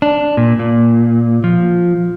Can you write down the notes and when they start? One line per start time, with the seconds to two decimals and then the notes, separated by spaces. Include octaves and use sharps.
0.02 D4
0.37 A#2
0.59 A#2
1.44 F3